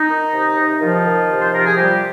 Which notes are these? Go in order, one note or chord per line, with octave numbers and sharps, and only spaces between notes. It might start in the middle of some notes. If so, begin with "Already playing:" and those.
Already playing: D#4
D#3
C3
C3
D#3 F3 F4
D#3
C3
C5
C3 A#4
G#4
F3 G3 G4